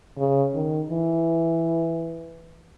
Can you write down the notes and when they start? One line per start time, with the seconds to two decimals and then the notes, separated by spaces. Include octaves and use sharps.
0.18 C#3
0.55 D#3
0.91 E3